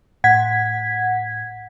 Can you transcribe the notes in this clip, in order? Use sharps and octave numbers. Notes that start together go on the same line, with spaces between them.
A2 F#5 G#6 B6